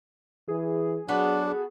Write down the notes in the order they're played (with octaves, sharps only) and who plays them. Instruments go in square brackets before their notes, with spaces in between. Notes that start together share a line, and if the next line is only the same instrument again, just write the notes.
[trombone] E3 [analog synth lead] G#4
[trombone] F#3 [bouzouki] B3 F#4 A4 [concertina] D4